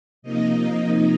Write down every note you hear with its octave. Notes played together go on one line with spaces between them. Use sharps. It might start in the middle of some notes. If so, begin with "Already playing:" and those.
C3 F3 A#3 D#4 D#5